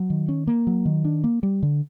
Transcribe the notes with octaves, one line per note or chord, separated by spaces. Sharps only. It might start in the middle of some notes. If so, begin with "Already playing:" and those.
Already playing: F#3
D#3
C#4
A#3
F#3
D#3
D4
A#3
G3
D3